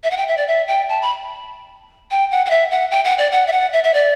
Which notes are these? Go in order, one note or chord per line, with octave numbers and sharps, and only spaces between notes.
E5
F#5
G5
E5
D5
E5
G5
A5
B5
G5
F#5
F#5
E5
F#5
G5
F#5
D5
F#5
E5
F#5
E5
E5
D5